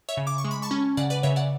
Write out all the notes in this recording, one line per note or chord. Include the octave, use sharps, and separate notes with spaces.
C#5 E5
C#3
D6
C#6
G#3
B5
A5 C#6
C#4
C#3 D5 F#5
B4 D5
C#3 C#5 E5
D5 F#5